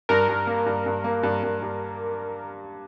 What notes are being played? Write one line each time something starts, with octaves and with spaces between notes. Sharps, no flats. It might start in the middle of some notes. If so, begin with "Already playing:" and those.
G2 A#4
G2
A#3
G2
G2
A#3
G2
G2
G2